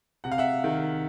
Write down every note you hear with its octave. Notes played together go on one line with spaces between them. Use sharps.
C3 F#5
F5
E5 F#5
D#3